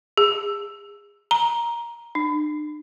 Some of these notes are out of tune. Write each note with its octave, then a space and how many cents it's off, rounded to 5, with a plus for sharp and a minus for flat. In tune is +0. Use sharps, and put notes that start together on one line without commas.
G#4 -35
A#5 +15
D4 +40